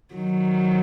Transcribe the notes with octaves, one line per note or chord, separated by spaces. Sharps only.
D#3 F#3